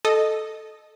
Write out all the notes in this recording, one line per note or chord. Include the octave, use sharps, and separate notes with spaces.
A4 D#5